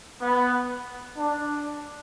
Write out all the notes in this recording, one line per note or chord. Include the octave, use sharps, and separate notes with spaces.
B3
D4